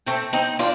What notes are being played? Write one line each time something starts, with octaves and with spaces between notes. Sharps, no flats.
A3 C4
C4 D#4
D4 F4